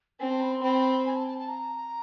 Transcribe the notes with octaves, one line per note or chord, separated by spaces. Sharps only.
C4 G#5
A5
B5
C6
C4 B5
G#5
A5
A5
A5
A#5